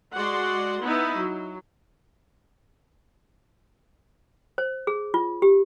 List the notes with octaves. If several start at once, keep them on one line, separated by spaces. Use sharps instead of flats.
G#3 F#4 D5 F#5 C6
B3 D#4 E4
F#3
C5
G#4
F4
G4